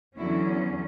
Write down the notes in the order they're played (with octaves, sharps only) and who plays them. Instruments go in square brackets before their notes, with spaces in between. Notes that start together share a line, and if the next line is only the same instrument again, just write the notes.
[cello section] E2 D3 F#3 C#4 E4